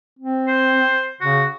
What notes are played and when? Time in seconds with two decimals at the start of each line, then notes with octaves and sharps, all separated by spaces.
0.19 C4
0.47 C5
1.21 C#3 F#4